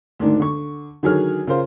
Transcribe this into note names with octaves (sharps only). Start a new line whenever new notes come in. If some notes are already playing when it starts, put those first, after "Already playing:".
D2 G#2 D#3 D4
D3 C#6
D3 D#3 F#3 G#4 C#5 F6
C#3 F4 A#4 C5 C6